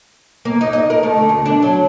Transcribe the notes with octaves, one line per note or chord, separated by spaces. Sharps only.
A#3
D#4
D#5
A#4
A3
D3
D2
D4
F#3